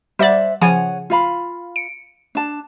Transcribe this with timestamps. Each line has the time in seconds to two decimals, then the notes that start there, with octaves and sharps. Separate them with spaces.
0.19 G3 C5 D5 E5 F#5
0.61 C#3 F3 C#5 F#5 G#5
1.10 F4 F5 B5
1.76 C#7 D7
2.35 D4 A5